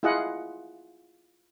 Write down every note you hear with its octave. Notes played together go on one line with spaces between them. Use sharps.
E4 F4 G#4 D#5 F#5